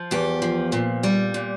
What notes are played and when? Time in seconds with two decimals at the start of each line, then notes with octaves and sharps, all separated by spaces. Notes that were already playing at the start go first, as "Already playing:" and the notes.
Already playing: F3
0.11 E2 G4
0.42 F3
0.72 A#2
1.03 G3
1.34 A#2